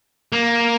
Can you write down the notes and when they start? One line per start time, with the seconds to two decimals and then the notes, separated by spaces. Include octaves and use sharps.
0.33 A#3